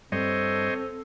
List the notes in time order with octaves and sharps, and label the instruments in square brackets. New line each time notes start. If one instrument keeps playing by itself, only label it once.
[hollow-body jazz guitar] G2 [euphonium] C4 [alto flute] A4 [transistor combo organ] C5 C#5 D#5